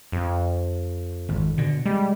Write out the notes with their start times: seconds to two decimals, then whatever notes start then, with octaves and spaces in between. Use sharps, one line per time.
0.12 F2
1.29 G#1
1.58 B2 D3
1.86 G3 G#3